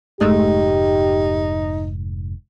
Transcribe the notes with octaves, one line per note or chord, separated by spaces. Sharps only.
F1 G#2 G#3 A3 D#4 G4